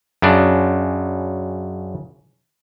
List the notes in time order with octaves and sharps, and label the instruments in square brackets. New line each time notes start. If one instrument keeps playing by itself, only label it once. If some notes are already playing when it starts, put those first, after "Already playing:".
[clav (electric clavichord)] F#2 C#3 D4